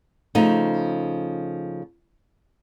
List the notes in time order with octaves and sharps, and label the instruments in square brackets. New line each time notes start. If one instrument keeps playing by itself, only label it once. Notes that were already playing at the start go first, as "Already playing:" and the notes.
[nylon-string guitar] C#3 F3 A3 D#4